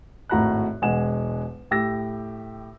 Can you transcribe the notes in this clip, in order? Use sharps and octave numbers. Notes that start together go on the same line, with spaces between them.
G#1 A2 F#4 A#5 B5 F#6
E1 G#3 F#5 G#5 E7
A2 G4 E6 A#6